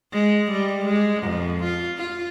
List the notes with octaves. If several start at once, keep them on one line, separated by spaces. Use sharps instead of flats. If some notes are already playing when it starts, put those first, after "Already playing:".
G#3
G3
G#3
F2
F4
F4